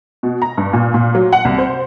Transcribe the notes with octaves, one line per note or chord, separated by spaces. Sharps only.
B2
A#5
G2
A#2
A#2
F#3
F#5
C2
C5